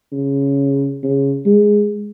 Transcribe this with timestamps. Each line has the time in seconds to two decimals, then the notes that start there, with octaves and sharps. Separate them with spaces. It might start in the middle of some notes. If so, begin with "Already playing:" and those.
0.12 C#3
1.03 C#3
1.46 G#3